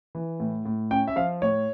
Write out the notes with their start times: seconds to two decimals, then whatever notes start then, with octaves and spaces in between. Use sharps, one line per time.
0.15 E3
0.40 A2
0.65 A2
0.91 C#4 G5
1.08 E5
1.16 F3 F5
1.42 A2 C#5